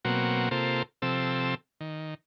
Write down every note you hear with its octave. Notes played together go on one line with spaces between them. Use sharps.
B2 F#3 A#3 C4 F#4
C3 A#3 F4 A4 C5
C3 F3 C4 A4 E6
D#3